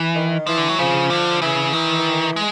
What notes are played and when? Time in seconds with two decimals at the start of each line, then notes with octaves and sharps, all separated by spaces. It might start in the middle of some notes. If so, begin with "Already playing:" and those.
Already playing: E3
0.15 D#3
0.47 E3 F3
0.57 D3
0.69 F#3
0.79 C#3 F3
1.10 D3
1.41 C#3 E3
1.73 D#3 E3
2.36 G#3